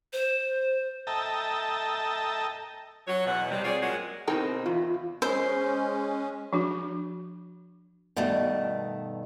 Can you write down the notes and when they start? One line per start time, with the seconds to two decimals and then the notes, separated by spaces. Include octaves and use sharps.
0.13 C5
1.07 A4 D#5 E5 G5 A5 A#5
3.08 F#3 C#5
3.26 E2 B2 F#5
3.51 C3 G3
3.64 C4 F4 G#4 C#5 D5
3.82 A#2 F#3 G#3 C#4 F#4 F#5
4.28 B2 C4 D#4 E4 A#4 G5
4.66 E2 F4
5.22 G#3 C#4 C5
6.53 F3 D4 F#4
8.16 G2 B2 D#3 A3